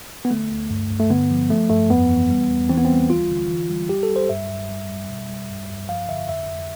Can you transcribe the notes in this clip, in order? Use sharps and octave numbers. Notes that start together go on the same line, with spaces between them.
B3
D3 A3
D2
G2
G2
A3
D3 B3
F3
F3 A3
G2 A3
F2 B3
E3
G3
E2
E3 C4
B3
C4
G3
D2 F4
D3
E3
G3
G3 G4
A4
G3
C5
G2 E5
G2
G3
G3
B2
G3
G2
G2
F3 F5
D3 E5
F2 E5
F2